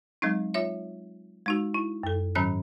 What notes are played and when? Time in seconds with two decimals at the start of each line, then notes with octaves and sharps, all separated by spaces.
0.22 F#3 G#3 C4 D#4
0.54 F4 C#5 E5
1.46 G#3 D#4 F#4
1.74 E4
2.03 F#2 A4
2.35 G#2 D#3 F#3 C#4 B5 F#6